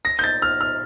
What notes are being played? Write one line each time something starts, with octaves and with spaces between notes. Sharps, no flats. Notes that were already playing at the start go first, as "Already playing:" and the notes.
A#6
G6
A6
F6
F6